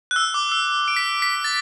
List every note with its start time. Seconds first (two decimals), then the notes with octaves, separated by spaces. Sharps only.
0.11 F#6
0.16 E6
0.34 D6
0.52 E6
0.88 D7
0.96 B6
1.22 B6
1.44 A6